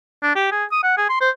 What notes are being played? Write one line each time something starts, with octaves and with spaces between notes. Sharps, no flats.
D4
G4
G#4
D#6
F#5
G#4
C6
C5